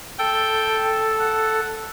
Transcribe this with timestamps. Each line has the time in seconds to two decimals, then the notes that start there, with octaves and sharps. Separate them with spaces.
0.19 A4 G5
1.20 F#5